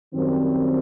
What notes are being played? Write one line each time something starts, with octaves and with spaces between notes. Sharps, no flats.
F#2 D#3 G3 C4